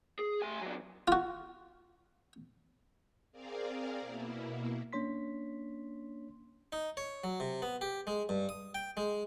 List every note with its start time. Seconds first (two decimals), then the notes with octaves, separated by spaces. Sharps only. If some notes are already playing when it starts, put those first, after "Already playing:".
0.19 G#4
0.42 A3 G#5
0.61 A#2 F#3
1.08 F4 F#4
3.32 C4 G#4 A#4 D5 F5
4.01 B2 A#3 E4
4.93 A#3 C#4 D4 C#5 C6 B6
6.72 D#4
6.97 C#5
7.24 F#3
7.40 C3
7.62 B3
7.81 G4
8.07 G#3
8.29 G2
8.49 D#6
8.75 G5
8.97 G#3